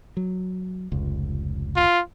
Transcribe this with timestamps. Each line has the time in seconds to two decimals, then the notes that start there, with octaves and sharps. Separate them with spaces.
0.17 F#3
0.92 F1 C#2
1.76 F4